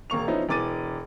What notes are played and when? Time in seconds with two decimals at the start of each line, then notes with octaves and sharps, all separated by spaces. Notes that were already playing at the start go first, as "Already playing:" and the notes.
0.10 E1 A#3 C#6 F7
0.28 F3 B3 C#4 D#4 E4
0.49 E1 E3 D6 A6 D#7